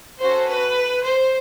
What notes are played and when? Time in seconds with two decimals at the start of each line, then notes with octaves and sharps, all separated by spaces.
0.20 C#4 F#4 A4 C5
0.49 B4
1.06 C5